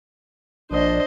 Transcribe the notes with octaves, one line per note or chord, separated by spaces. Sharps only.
A#1 D4 C5 D#5